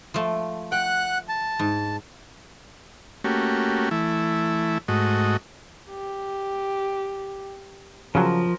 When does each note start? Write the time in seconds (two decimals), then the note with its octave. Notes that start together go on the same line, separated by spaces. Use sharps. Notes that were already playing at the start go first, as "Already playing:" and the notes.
0.14 F3 A3
0.72 F#5 G5 F#6
1.29 A5
1.59 G#2
3.24 A3 A#3 C#4 F#4 G4
3.91 E3 A3 E4
4.88 G#2 A3 F#4 D#5
5.90 G4
8.15 C#3 F3 F#3 A#4